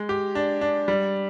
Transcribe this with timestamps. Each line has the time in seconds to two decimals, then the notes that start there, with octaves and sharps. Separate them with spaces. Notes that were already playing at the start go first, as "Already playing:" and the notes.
Already playing: G#3
0.09 G4
0.35 D4
0.61 D4
0.88 G3